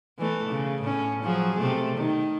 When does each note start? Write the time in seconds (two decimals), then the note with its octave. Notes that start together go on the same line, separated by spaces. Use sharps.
0.19 E3 A3
0.50 C#3
0.82 A2 C#4
1.23 F3 F#3 G#4
1.58 C3 A3
1.97 D#3